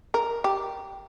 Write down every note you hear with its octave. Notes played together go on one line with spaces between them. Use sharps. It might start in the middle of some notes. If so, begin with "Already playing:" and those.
A#4
G4